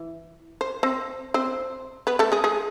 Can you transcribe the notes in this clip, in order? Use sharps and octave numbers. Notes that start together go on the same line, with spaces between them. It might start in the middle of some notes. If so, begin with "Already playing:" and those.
Already playing: E3
C5
C4 C5
C4 C5
B3 B4
A3 A4
G#3 G#4
G#3 G#4